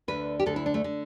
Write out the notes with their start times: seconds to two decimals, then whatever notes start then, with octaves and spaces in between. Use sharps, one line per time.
0.08 D2 D3 B4
0.40 G4
0.46 D2 D3 A4
0.56 E4
0.66 D4
0.74 A3
0.84 D3